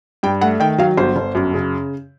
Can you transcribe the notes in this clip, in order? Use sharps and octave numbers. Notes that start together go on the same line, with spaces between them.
G2 G5
A3 F#5
D#3 G5
F#3 F5
G1 C5
G1
F#2
C#3